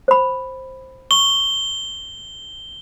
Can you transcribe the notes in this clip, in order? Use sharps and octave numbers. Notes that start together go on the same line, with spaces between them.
C5 B5
C#6 G7